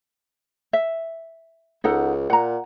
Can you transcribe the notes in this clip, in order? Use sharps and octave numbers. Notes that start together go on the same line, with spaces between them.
E5
C#2 D#4 A4 F#5
A#2 F#5 A#5